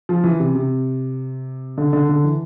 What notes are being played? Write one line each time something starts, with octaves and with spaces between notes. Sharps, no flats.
F3
E3
C3
C3
D3
D3
D3
E3